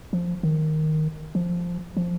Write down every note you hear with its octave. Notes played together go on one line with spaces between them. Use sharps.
F3
D#3
F3
F3